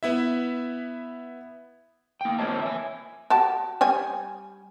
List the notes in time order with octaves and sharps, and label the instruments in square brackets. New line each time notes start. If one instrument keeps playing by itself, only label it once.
[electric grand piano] B3 E4 E5
[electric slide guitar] A#3 G5
A#3 C4 F4 C#5 D#5 A5
E5 G#5
[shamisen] F#4 G4 A5
G3 G5 G#5